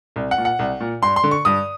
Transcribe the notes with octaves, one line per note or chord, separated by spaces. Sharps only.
C2
F#5
A#2
F#5
C2
A#2
G2 C6
C6
D3
C#6
G2 D#6